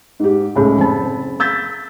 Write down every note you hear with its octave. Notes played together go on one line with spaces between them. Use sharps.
G#2 G4
C#2 A2 G#4
F#1 C4 A5 B5
E6 G6 A6 B6